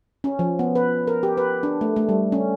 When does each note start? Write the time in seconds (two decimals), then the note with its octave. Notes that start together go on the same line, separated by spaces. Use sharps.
0.24 C#4
0.39 F3
0.59 B3
0.75 B4
1.07 A#4
1.23 G4
1.37 B4
1.63 D4
1.81 A3
1.96 A3
2.09 G3
2.32 C#4